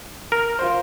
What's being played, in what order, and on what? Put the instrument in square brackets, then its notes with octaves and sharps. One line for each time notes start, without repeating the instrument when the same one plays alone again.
[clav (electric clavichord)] A#4
[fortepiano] F4 C5